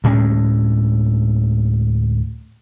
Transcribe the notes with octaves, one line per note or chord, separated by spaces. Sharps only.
D2 A2 G#3 C#4